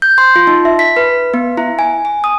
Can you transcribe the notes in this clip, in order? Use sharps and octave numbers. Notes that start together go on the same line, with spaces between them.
G6
C6
F4
D#4
E5
B6
B4
B3
E4
G#5
G#5
D#6